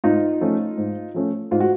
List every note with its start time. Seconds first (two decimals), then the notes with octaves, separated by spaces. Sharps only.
0.04 G#2 D#4 F4
0.41 F3 A3 C#4
0.77 G#2
1.14 F3 A3 C#4
1.51 G#2 F4
1.60 F#4